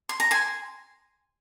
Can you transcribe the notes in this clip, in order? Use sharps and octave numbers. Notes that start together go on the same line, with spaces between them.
C6
A#5
G#5 C6